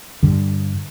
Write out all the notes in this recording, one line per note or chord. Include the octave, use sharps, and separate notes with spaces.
G2 D3